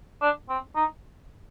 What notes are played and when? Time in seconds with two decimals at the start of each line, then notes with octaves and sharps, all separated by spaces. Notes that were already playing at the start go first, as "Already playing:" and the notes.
0.21 D4
0.49 C4
0.76 D#4